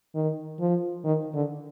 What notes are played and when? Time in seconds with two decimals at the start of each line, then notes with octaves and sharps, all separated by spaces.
0.15 D#3
0.60 F3
1.04 D#3
1.34 D3